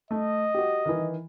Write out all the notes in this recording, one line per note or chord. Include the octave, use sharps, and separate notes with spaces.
A3 D#5
F#4 G4
D#3 E3